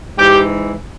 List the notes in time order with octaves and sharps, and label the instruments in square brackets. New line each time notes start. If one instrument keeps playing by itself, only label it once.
[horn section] G#2 E3 G4